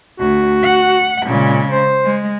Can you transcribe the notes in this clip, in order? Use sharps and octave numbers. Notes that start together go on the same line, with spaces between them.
D2 F#4
F#5
A#2 C#3 G#3
C5
G#3